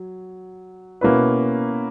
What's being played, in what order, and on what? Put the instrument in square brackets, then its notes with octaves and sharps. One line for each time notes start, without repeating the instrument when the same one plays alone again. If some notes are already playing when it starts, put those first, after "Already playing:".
Already playing: [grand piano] F#3
B2 A#3 C#4 E4 B4